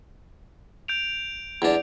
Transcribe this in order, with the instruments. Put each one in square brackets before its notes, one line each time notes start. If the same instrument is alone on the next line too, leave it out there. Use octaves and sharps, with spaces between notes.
[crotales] G6 D7 F7
[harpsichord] E2 D4